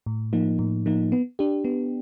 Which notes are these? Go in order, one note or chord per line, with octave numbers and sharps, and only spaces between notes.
A2
F3 A#3 D#4
A2
F3 A#3 D#4
B3
D4 G4
B3